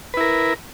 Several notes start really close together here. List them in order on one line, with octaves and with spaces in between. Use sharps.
B4 E4 A#4